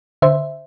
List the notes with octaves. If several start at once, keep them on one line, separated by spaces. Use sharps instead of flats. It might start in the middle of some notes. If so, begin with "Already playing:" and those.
D3 C5 E5